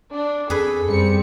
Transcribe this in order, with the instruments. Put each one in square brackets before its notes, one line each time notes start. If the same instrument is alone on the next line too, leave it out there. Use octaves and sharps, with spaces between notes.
[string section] D4
[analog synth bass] F2 [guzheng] G#4 B4 [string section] A4
[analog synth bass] F#2 [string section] G3 C4 C#7